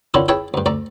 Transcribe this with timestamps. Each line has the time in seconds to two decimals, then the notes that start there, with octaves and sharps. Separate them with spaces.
0.14 D3 D#3 C#4 D4 E4 F4
0.28 E4 G#4 B4 C#5 G5 A5
0.54 D2 G2
0.66 D2 A3 D5 A#5